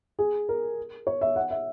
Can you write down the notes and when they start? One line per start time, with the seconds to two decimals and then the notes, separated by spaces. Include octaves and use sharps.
0.19 G#4
0.49 A#4
1.07 C#5
1.21 E5
1.36 F#5
1.51 E5